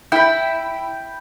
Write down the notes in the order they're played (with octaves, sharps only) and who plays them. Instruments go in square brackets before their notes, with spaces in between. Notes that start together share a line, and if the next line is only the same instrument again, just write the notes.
[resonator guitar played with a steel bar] E4 [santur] G5 B5